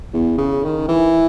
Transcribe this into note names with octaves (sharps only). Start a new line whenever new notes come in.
E2
C#3
D#3
E3